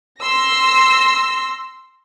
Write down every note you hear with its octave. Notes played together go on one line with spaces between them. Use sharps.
C6 E6 A#6